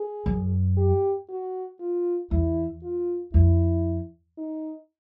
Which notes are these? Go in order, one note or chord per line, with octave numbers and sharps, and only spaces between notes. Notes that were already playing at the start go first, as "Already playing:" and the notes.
Already playing: G#4
F#2
G4
F#4
F4
E2 E4
F4
F2 E4
D#4